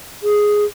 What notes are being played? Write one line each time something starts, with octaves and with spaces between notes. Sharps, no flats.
G#4